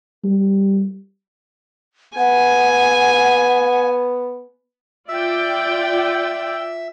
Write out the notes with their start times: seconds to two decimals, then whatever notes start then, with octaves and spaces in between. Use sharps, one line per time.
0.24 G3
2.18 B3 F#5 G#5
5.09 F4 D5 E5 G5 E6